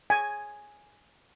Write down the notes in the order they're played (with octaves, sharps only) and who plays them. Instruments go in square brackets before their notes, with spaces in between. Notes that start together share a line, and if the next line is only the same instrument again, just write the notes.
[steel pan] G#5